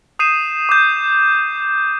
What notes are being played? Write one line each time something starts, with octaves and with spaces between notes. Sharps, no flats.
D#6 G6 C7 D#7 E7
D6 G6